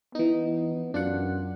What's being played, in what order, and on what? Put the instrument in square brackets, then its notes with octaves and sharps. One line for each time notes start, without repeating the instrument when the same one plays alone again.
[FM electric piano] E3 D#4 [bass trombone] B3
[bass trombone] F#2 [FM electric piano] D4 F4 F#5